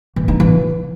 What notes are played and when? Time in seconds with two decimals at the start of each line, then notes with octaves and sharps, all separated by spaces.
0.16 E3
0.28 D#4
0.40 E3